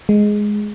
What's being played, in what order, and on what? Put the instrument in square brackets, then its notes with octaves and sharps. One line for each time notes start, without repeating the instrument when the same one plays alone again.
[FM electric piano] G#3